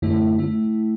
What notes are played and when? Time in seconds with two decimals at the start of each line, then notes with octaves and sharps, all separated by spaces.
0.02 F#2 D3 A3 E4
0.39 A3 E4